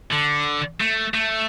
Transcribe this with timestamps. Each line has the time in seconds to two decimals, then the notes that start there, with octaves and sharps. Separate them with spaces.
0.12 D3
0.81 A3
1.14 A3